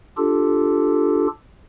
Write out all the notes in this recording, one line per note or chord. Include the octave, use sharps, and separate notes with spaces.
D4 F4 G4 A4